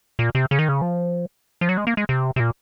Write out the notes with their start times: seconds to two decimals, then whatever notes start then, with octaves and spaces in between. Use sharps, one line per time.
0.19 A#2
0.35 C3
0.51 C#3
0.59 D#3
0.69 C#3
0.82 F3
1.61 F3
1.69 F#3
1.77 G#3
1.87 A#3
1.97 G#3
2.09 C3
2.36 C3
2.40 A#2